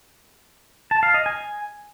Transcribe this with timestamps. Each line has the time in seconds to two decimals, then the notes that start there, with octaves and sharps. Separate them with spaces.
0.91 A5
1.03 F5
1.14 D#5
1.26 G#5